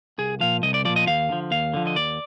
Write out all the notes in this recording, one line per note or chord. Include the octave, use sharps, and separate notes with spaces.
C2 G#4
A#2 F3 F5
C2 D#5
D5
A#2 F3 D5
D#5
D#2 F5
D3 F3
D#2 F5
D3 F3
D#5
D#2 D5